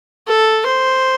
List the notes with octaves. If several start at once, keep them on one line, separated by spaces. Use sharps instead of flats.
A4
C5